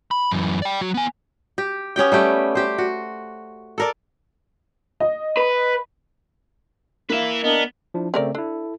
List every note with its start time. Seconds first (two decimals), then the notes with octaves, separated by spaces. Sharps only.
0.11 B5
0.31 F#2 E3
0.62 D5 G5
0.81 F#3 F#4
0.94 B3 G#5
1.58 G4
1.96 B3 C#4 G4 G5
2.12 G3 A3 G4
2.55 G4 C5
2.78 F#4
3.78 A4 A#4 D5
5.00 D#5
5.37 B4
7.10 A#3 E4 B4 E5 F5
7.44 B3 D4 A#4 D#5
7.94 F3 D4 E4
8.14 C#3 A3 C4 C#4 A#4 D5
8.35 D4 E4 A4